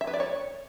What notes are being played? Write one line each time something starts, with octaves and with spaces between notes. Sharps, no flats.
E5
B4
D5
C#5